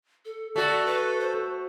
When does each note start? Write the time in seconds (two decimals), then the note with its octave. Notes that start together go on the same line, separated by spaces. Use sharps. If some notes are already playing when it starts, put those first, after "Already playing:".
0.25 A4
0.56 A3 F#4 A4 D5
0.86 B4
1.20 C5